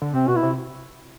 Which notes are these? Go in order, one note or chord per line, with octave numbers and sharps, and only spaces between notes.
D3
C3 C4
B2 F#4
E4
C3